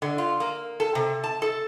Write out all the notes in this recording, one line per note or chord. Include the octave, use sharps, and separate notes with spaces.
D3
F4
A#3
A4
C3
A5
A4